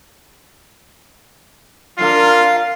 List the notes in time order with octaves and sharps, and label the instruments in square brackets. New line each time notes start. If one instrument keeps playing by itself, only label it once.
[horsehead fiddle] D4 A#4 [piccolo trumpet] F4 [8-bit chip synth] F5 C7